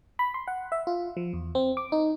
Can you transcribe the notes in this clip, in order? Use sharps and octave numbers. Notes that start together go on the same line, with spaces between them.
B5
C6
F#5
E5
F4
F3
E2
C4
D6
D#4